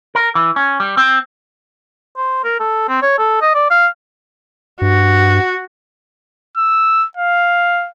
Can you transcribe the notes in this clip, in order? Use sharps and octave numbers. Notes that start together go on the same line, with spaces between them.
A#4
E3
C#4
G3
C4
C5
A#4
A4
C4
C#5
A4
D#5
D5
F5
G2 F#4
E6
F5